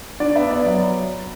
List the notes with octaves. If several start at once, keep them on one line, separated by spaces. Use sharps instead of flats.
D4 D5
B3 E5
B3 D5
F#3